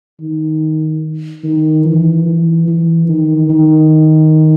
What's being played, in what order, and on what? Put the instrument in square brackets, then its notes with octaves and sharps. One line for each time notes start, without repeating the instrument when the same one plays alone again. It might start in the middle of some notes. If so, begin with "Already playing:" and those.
[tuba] D#3
D#3
E3
E3
E3
D#3
D#3